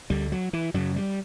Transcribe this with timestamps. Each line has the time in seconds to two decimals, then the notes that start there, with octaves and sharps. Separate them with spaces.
0.10 D2 D3 G3
0.32 F#3
0.53 E3
0.74 F#2 C#3 F#3
0.96 G3